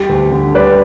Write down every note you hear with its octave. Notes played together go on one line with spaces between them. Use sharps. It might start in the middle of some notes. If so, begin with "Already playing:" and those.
Already playing: G3 G4
D2
D3
G3 B4 D5